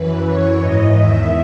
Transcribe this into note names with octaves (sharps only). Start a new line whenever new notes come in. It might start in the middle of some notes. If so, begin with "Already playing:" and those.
Already playing: F#2 E3 B4
F#2 E3 C#5
G#2 E3 D#5
E2 D#3 E5